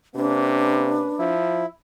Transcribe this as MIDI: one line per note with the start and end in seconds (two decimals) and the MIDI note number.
0.15 1.08 48
0.15 1.27 58
0.15 1.27 61
0.15 1.30 62
0.15 1.27 71
1.19 1.64 53
1.19 1.66 64